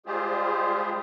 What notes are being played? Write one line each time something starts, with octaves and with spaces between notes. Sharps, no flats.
G3 G#3 F4 G4 G#4 C5